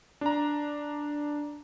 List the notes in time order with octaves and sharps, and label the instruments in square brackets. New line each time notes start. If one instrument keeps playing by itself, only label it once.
[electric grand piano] D4 A#5